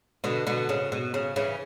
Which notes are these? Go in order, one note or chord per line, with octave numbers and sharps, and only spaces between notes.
B2 D3
B2 D3
C#3
B2
C#3
C#3 E3